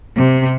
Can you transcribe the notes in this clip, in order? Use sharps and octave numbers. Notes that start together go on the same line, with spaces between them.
C3